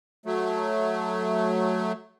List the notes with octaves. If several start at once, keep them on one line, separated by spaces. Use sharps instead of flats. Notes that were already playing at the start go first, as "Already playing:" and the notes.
F#3 A3